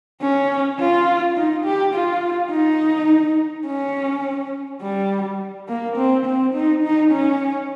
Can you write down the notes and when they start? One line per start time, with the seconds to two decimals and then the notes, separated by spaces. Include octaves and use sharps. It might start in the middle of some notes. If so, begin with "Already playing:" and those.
0.22 C#4
0.79 F4
1.36 D#4
1.65 G4
1.94 F4
2.52 D#4
3.66 C#4
4.82 G3
5.69 A#3
5.97 C4
6.26 C4
6.54 D#4
6.83 D#4
7.12 C#4